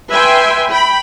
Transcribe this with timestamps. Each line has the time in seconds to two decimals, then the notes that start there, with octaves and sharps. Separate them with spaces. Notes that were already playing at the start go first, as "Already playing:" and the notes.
0.11 B4 E5 G5 G#5 C6
0.72 G5 B5